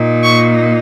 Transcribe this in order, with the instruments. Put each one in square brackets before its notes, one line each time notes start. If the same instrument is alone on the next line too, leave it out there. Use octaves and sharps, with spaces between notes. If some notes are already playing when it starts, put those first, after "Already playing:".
Already playing: [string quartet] A#2 A#3 D#4
C#6